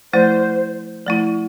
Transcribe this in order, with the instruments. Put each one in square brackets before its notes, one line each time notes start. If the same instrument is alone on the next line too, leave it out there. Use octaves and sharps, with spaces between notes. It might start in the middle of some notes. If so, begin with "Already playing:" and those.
[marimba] F3 A3 E4 [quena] C5
[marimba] F3 A3 E4